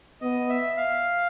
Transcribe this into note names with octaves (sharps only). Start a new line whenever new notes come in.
B3 D#5
E5
F5